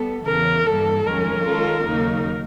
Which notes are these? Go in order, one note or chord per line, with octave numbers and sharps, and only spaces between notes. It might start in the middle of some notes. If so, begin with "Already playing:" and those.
Already playing: G3 B3 A4
E2 C#3 E3 A#4
G2 E3 G3 A#3 A4
F2 C3 D#3 G#3 C#4 A#4
D#3 G#3 C#4 F4 A4
D#2 C#3 F#3 A#3 D#4